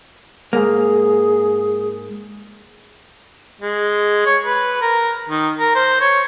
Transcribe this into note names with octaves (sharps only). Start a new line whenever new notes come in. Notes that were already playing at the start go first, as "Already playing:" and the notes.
G#2 A#3 G#4
G#3
C#5
B4
A#4
D#3
A#4
C5
C#5